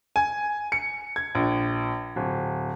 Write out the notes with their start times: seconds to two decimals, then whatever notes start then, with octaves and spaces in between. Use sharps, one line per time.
0.16 G#5
0.72 C#7
1.16 G#6
1.35 A#1
2.16 D1